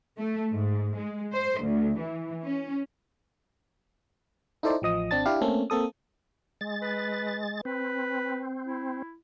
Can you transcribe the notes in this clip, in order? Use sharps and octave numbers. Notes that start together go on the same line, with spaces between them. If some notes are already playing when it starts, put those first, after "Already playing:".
A3
G#2
G#3
C5
D2
E3
C#4
D#4 E4 A4 C5 D5
A1 F3 D#5 D#6
G#1 C4 D4 A5 A6
D4 E4 G4 F5
A3 A#3 C4 C#4 A4
A#3 C4 A4 D#6
G#3 A6
B4
C4 B4
E4